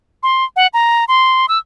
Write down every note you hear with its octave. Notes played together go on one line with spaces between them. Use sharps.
C6
F#5
A#5
C6
E6